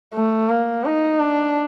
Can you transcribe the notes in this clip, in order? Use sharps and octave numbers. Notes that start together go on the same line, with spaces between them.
A3
A#3
D#4
D4